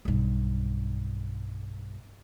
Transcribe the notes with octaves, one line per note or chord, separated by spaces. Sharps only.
B1 G2